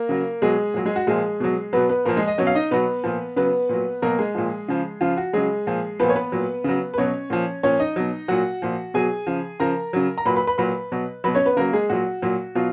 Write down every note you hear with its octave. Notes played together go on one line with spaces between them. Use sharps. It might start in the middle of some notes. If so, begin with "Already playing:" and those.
Already playing: A#3 A#4
C#3 F#3
B2 F#3 G#3 G#4
A#2 F#3
G#3 G#4
F#4
A#2 F3 G#3 G#4
B2 F#3
B2 F#3 B3 B4
B3 B4
A#2 F3 A#3 A#4
G#3 G#4
D#5
B2 F#3 C#4 C#5
F5
D#4 D#5
B2 F#3 B3 B4
A#2 F3
C#3 F#3 B3 B4
A#2 F#3
B2 F#3 A#3 A#4
G#3 G#4
A#2 F3
C#3 F3
C#3 F3 F4
F#4
C#3 F#3 G#3 G#4
A#2 F3
A#2 F3 B3 B4
C#5
B3 B4
A#2 F#3
C#3 F#3
B4
B2 F#3 C#4 C#5
A#2 F3
A#2 F3 C#4 C#5
D#4 D#5
B2 F#3
A#2 F#3 F#4 F#5
A#2 F3
B2 F#3 G#4 G#5
C#3 F3
C#3 F3 A#4 A#5
C#3 F#3
A#5
A#2 F#3 B4 B5
B4 B5
B4 B5
A#2 F#3 B4 B5
B2 F#3
B2 F#3 B4 B5
C#4 C#5
B3 B4
C#3 F#3 A#3 A#4
G#3 G#4
A#2 F#3 F#4
A#2 F#3
B2 F#3 F4